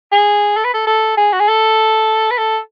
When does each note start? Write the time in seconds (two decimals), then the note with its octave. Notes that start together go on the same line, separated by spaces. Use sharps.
0.12 G#4
0.56 A4
0.65 B4
0.74 A4
0.87 A4
1.17 G#4
1.33 F#4
1.40 G#4
1.48 A4
2.31 B4
2.38 A4